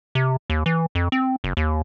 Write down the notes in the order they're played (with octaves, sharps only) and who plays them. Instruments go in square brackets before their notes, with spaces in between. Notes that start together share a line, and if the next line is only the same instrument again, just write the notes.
[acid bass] C3
D#2
E3
F2
C4
F#1
D#2